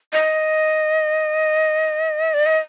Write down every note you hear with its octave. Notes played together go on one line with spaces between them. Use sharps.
D#5
D5
D#5